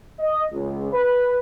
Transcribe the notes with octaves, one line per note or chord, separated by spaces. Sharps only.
D#5
C#2
B4